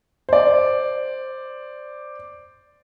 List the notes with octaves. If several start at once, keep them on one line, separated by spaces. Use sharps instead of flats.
C5 D5